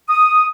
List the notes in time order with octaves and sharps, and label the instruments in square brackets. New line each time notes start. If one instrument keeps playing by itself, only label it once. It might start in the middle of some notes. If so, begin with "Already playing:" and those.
[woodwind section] D#6